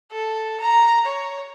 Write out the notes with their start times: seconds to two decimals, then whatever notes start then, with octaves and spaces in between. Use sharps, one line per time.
0.12 A4
0.60 A#5
1.06 C#5